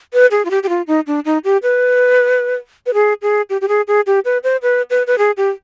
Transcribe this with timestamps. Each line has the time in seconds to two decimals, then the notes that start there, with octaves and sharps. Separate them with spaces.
0.13 B4
0.31 G#4
0.45 F4
0.50 G4
0.63 G4
0.69 F4
0.87 D#4
1.07 D4
1.25 D#4
1.44 G4
1.63 B4
2.86 B4
2.94 G#4
3.22 G#4
3.50 G4
3.61 G4
3.68 G#4
3.88 G#4
4.07 G4
4.25 B4
4.44 C5
4.62 B4
4.90 B4
5.07 B4
5.18 G#4
5.37 G4